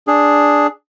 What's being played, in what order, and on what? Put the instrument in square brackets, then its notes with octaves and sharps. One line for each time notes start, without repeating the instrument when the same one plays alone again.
[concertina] D4 G#4